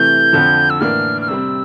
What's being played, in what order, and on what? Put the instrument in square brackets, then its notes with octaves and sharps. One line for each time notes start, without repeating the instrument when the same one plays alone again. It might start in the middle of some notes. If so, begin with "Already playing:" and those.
Already playing: [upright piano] C3 E3 A3 [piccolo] G6
[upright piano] F2 D3 F3
[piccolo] E6
[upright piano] A2 E3 A#3 D4 [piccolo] F6
[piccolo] F6
[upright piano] C3 G3 C4 [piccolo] E6